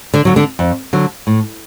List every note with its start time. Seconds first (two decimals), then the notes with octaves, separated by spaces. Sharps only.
0.14 D3 D4
0.25 D3 F#3
0.36 D3 D4
0.59 F2
0.93 D3 F#3
1.27 A2